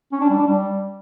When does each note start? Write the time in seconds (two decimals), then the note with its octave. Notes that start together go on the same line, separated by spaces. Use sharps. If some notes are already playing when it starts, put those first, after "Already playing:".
0.12 C#4
0.21 D4
0.30 G3
0.38 D4
0.47 G3